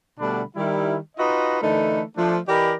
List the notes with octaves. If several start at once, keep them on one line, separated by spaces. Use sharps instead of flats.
B2 D3 G3 A3 D4 B5
D#3 G3 E4
D#4 F4 F#4 B4 D#5
D3 E3 A3 D#4 A#4 B4
F3 A3 D4
E3 G4 A#4 D5 D#5 B5